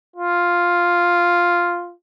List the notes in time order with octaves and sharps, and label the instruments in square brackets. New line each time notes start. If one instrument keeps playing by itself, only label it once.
[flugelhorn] F4